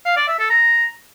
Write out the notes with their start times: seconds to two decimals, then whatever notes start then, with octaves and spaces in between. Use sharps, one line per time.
0.05 F5
0.17 D5
0.28 E5
0.39 A4
0.50 A#5